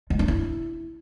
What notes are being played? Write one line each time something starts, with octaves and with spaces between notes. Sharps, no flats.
G#3
D4
E4